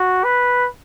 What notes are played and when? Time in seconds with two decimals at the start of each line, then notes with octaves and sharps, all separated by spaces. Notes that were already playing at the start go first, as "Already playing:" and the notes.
Already playing: F#4
0.24 B4